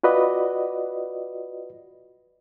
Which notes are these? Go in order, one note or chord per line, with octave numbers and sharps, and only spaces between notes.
F4 F#4 B4 D5 D#5